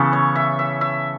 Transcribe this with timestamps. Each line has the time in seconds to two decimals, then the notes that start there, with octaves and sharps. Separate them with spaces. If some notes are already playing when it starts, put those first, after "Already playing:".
Already playing: C#3 E3 B3 A4
0.13 C#5
0.36 E5
0.59 E5
0.81 E5